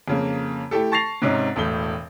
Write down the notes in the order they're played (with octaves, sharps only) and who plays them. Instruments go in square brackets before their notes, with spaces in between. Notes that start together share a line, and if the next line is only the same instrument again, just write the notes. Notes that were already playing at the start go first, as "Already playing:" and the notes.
[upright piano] F2 C#3 A#3
A3 E4 G4 A4
A5 C#6 A6 A#6 C7 F7
G#2 C3 C#4 D#4
E1 A2 G7